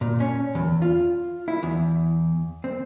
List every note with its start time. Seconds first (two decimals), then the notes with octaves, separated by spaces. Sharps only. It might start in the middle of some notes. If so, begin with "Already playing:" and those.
0.01 A#2
0.20 C#4
0.55 E2
0.82 F4
1.48 E4
1.63 E2
2.64 C4